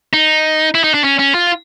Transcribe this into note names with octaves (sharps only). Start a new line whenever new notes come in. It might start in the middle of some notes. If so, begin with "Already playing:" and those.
D#4
E4
D#4
D4
C#4
C#4
F4